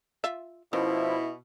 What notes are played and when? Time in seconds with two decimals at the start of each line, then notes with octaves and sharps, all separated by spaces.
0.24 F4 E5
0.73 B2 F3 C#4 D#4 E4 A#4